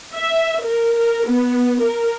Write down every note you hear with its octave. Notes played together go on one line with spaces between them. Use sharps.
E5
A#4
A#4
B3
A#4